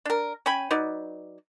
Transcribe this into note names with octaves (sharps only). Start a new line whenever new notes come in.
D4 A#4
C#4 G5 G#5 B5
F#3 D#4 B4 D5